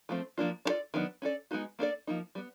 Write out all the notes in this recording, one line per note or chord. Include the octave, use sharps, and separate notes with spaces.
F3 A3 C4
F3 A#3 D4 F4
D4 F4 A4 D5
D#3 F#3 B3 D4
C#4 F#4 A4 D5
G#3 B3 D#4 F#4
A#3 D4 F#4 A4 D5
F3 A#3 D#4
G3 B3